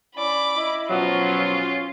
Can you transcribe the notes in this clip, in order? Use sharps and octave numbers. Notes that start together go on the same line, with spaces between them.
C#4 E4 D5 B5 D6
E4 D#5
B2 F3 F#3 C#4 F4